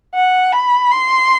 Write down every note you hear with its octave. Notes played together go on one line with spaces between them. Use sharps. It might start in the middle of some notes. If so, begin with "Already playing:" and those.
F#5
B5
C6